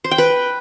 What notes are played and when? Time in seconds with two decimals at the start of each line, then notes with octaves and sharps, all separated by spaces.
0.04 C5
0.11 G5
0.18 B4